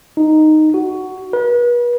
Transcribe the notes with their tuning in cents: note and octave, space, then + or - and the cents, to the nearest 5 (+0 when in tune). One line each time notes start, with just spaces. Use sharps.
D#4 -5
F#4 +10
B4 -40